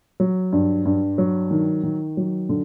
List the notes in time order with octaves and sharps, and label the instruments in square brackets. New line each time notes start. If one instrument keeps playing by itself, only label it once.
[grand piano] F#3
G2
G2
F#3
D#3
D#3
F#3
D3